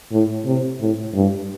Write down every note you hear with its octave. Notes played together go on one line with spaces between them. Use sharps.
A2
C3
A2
G2